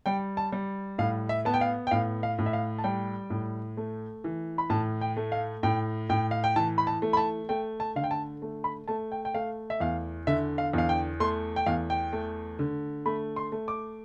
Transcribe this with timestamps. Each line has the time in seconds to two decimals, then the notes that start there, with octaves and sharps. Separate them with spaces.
0.06 G3 G5
0.37 A5
0.52 G3
0.98 A2 F5
1.29 E5
1.45 B3 A5
1.54 G5
1.61 F5
1.87 G5
1.91 A2 F5
2.23 F5
2.39 A2
2.46 E5
2.53 F5
2.78 A5
2.84 G3 G5
3.30 A2
3.77 A3
4.24 E3
4.58 B5
4.70 A2 A5
5.01 G5
5.17 A3
5.32 F5
5.63 A2 G5
6.09 A2 G5
6.31 F5
6.44 G5
6.56 E3 A5
6.78 B5
6.87 A5
7.02 A3
7.13 B5
7.17 A5
7.49 A3 G5
7.80 A5
7.96 D3 F5
8.04 G5
8.11 A5
8.42 A3
8.64 B5
8.88 A3 A5
9.12 G5
9.25 G5
9.34 A3 F5
9.70 E5
9.80 E2 F5
10.27 D3 E5
10.58 F5
10.73 E2 F5
10.89 G5
11.20 A3 C6
11.56 G5
11.66 E2 F5
11.90 G5
12.13 A3
12.59 D3
13.06 A3 B5
13.36 C6
13.52 A3
13.68 D6